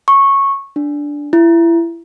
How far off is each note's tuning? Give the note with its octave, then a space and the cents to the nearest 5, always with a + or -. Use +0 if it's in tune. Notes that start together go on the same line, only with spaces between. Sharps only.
C#6 -10
D4 -5
E4 +25